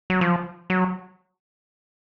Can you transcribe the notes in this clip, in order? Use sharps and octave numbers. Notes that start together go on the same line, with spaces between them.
F#3
F3
F#3